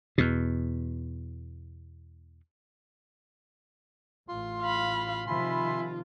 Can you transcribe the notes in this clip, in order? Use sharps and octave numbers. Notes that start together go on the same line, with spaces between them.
E2 B2
A1 F4 C6
F5 B5
C3 D#3 F3 F4 E5 G#5 B5 C6